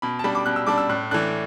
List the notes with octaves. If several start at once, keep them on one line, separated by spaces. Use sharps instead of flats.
B2 B5
A5
G3 D4 B5
D6
B2 F#6
E6
G3 D4 D6
E6
A2 F#6
E3 A3 D4 F#6